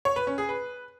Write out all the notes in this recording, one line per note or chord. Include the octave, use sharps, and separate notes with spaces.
C#5
B4
C#4
G#4
B4